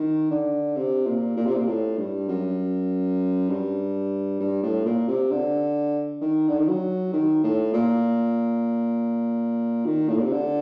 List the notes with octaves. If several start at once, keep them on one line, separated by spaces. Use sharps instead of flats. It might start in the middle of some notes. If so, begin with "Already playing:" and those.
Already playing: D#3
D3
C3
A#2
A#2
C3
A#2
A2
G2
F#2
G2
G2
A2
A#2
C3
D3
D#3
D3
D#3
F#3
D#3
A2
A#2
D#3
A2
A#2
C3
D3